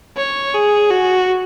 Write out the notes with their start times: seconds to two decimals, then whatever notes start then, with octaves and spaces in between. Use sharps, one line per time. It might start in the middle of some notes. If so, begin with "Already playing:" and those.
0.17 C#5
0.55 G#4
0.91 F#4